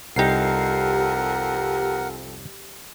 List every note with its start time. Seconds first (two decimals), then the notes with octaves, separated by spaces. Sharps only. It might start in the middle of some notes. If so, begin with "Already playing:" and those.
0.16 C2 F2 D#4 G4 A#4 F#5 C7